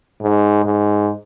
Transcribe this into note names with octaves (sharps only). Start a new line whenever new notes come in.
G#2
G#2